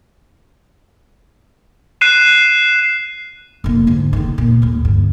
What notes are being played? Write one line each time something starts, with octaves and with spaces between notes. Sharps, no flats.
F#6 C7 D#7 E7
F1 A#3
G#2 D3
F1 D#3
A#2
D#2 A2
D2 G2